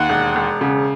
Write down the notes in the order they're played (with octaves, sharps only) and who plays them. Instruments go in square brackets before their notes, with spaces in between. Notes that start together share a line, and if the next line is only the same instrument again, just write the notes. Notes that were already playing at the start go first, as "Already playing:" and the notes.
Already playing: [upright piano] D#2 [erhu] F#5
[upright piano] E1
E1
C#3